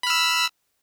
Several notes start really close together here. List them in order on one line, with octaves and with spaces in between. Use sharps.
B5 F6 E6